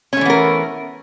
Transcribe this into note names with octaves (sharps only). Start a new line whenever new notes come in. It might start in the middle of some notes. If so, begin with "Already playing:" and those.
E3 A3 B3 C#4 A#4